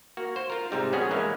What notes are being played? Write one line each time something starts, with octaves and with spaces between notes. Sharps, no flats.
A#3 F#4
C5
F4 A#4
G#2 C3 G3 D#4
A#1 B3 C#4 F#4 G#4 D#5
E3 G#3 A#3 C#4